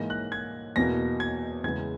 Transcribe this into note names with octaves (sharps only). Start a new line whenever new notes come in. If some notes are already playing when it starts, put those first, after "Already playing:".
Already playing: G#2 E3 A#3 A#6
F#6
G#6
E2 B2 A#3 A#6
G#6
E2 C#3 G#3 B3 G#6